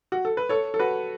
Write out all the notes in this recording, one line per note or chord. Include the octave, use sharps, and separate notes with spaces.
F#4
A4
B4
A4 C#5
A4
F#4 B4